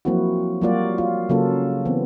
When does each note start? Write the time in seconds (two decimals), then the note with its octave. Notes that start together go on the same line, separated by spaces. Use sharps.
0.05 F3 F#3 A#3 C4 E4 F#4
0.61 F#3 G3 A#3 F4 F#4 D5
0.98 F4
1.29 C#3 F#3 A#3 C#4 F4 A4
1.85 E3 B3 C4